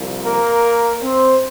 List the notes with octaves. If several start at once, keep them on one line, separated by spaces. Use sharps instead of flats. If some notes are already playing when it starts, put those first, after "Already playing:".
Already playing: C2 A#2 F3
A#3 A#4
C4 C5